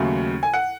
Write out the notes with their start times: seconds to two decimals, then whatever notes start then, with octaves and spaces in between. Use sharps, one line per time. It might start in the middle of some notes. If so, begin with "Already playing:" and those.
Already playing: D#2 C#3 F#3 A3
0.43 G#5
0.54 F#5